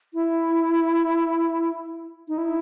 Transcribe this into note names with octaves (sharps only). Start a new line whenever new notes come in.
E4
D#4
E4